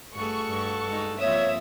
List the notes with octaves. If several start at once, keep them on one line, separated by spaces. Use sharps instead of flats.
G2 A3 F#4 G#4 A4 C#6
G2
G#3 D#4
F3 A#3 C4 C#5 E5 D#6